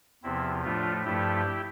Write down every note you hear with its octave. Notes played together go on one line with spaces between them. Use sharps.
E2 C3 F3 C4 E4
A2 F3 A3 D4 F4
G2 F3 A3 E4 G4